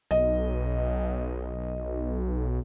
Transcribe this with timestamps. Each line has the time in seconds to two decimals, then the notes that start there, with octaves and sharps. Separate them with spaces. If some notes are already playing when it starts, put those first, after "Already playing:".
0.11 B1 D#5